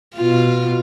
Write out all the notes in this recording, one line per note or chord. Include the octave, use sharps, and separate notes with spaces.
B2 F4